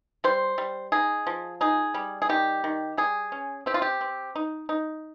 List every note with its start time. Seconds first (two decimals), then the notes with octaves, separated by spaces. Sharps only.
0.24 G3 C5
0.58 G3
0.92 D#4 G#4
1.27 F3
1.61 D#4 G#4
1.94 G3
2.22 G#4
2.29 D#3 G4
2.64 D#3
2.97 G3 G#4
3.32 C#4
3.66 C4 G4
3.74 F4
3.82 G4
4.01 C4
4.35 D#4
4.69 D#4